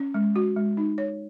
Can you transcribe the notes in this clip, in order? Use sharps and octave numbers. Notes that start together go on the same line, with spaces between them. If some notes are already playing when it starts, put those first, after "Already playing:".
Already playing: C#4
G#3
F#4
G#3
D#4
C#5